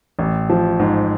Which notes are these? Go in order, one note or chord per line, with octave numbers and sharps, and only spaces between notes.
A1
F3
G#2